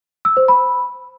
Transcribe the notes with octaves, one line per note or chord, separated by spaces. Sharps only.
E6
C5
B5